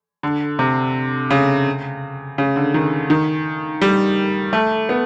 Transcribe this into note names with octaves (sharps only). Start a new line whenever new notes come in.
D3
C3
C#3
C#3
D3
D#3
D#3
G3
A3
B3